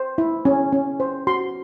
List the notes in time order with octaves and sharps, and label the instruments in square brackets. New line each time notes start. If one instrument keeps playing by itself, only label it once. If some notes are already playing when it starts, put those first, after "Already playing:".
Already playing: [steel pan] C5
E4
C#4
C#4
C5
F#4 C6